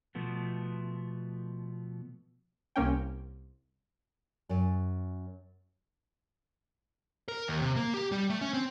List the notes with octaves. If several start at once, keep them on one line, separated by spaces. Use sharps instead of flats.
B2 F3 A3 B3
C2 A#3 C#4 G5
F#2
A#4
D#2
C3
A#3
G4
G3
A3
C#4
C4